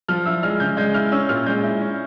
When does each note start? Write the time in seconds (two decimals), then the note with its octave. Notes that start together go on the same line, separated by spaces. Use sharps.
0.08 F3 F6
0.26 E4 E6
0.43 G#3 F6
0.60 C#3 G6
0.77 G#3 G6
0.94 E4 F6
1.12 C#4 E6
1.29 A#2 F6
1.46 G#3 G6
1.63 E4
1.81 C#4